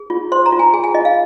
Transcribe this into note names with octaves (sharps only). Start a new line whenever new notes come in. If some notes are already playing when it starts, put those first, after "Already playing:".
Already playing: G#4
F4
C5 C6
A#5
F4
G#5
G#4 G#5
G#5
F4 D#5
F5